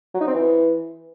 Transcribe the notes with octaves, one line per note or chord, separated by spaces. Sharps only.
F#3
D#4
C4
E3